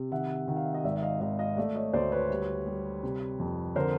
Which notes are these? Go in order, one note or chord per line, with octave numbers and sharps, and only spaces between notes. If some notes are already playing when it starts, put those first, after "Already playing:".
Already playing: C3
D#3 E5 F#5
D#3 F#5
F5
E5
D#5 F5
G#1 D5 E5
E5
D#5 F5
G#1 D#5 F5
D#5 F5
A3 D5 E5
C#5 D#5
D2 C5 D5
B4 C#5
G3
G3
C3
F2
D3 A#4 C5